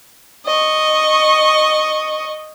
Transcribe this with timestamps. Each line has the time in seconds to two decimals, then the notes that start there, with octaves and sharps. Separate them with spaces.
0.46 D#5 C#6